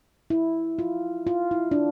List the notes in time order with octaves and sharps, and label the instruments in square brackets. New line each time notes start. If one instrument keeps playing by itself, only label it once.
[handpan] E4
F4
F4
E4
D4